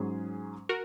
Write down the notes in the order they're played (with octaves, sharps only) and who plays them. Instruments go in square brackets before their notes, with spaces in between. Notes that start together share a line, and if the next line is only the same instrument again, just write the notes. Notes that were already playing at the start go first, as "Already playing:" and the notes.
Already playing: [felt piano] G#2 F#3 C#4 G#4
[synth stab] F#4 A#4